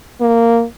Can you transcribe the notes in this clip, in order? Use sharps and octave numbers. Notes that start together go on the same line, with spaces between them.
A#3